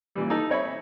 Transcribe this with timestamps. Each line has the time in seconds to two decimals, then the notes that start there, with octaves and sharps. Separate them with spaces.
0.15 A#2 E3 G3
0.30 D#4 A4
0.50 C4 C#5 E5 B5